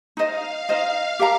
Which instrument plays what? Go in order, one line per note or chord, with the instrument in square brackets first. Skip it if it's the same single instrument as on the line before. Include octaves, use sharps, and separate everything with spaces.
[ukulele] D#4 C5 D#5 [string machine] F5
[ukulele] D#4 C5 D#5
G4 A#4 F5 A#5